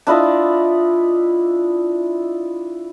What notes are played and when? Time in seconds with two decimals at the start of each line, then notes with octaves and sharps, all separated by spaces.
0.07 D4 E4 F4 D#5